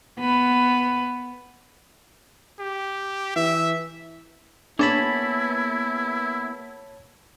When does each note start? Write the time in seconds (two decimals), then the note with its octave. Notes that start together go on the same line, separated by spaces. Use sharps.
0.19 B3 B4
2.59 G4
3.36 E3 E5
4.79 A#3 B3 D4 E4 G#4 C#5 A5 B5